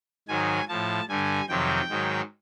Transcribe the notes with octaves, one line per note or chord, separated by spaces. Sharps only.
G#2 D#3 F#3 G#5
A2 F3 A5
G2 D3 G3 G#5
F2 C3 D#3 F#3 G5
G#2 D#3 F#3